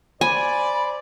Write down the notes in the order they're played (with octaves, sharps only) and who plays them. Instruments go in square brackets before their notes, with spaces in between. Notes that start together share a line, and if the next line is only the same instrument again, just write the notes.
[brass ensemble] C5 D5 [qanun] G#5 [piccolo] B5